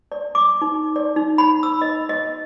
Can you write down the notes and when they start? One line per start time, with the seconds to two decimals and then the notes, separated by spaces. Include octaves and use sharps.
0.12 D5
0.35 D6
0.62 D#4
0.96 D5
1.16 D#4
1.38 B5
1.63 E6
1.82 D#5
2.09 D#5